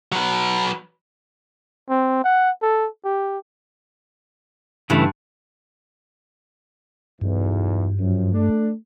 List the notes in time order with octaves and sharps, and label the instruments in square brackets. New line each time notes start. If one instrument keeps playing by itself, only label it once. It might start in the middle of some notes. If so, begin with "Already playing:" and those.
[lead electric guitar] F#3 B4
[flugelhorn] C4
F#5
A4
G4
[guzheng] G2 [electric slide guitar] C#3 E3 A3
[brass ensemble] B1 E2 [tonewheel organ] G2
[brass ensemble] F#2 F3
A3 D4